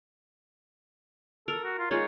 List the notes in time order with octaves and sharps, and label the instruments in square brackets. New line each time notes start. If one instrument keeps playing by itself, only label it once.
[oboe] A4 [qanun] A#4
[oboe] F#4
F4
[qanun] G#3 D#4 F4 [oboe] C#5